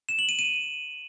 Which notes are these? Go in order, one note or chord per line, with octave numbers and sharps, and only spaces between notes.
E7
F#7
D#7
D#7